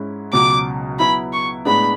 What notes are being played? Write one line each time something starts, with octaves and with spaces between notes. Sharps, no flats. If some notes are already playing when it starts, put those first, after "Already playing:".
Already playing: G#2 G#3 C#4 E4
C#2 B2 F#3 D6
F#3 B3 E4 B5
C#6
A2 G#3 B3 D4 B5